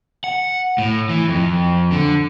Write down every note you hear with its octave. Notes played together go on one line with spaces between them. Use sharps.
F#5
A2
E3
F2
D3